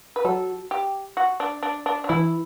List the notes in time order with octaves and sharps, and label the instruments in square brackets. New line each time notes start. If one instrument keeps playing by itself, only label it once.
[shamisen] B4
[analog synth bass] F#3 [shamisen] A4
[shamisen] G4
F#4
D4
D4
D4
D4
[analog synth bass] E3 [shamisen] E4